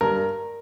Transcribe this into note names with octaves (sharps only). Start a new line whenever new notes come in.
G2 A#4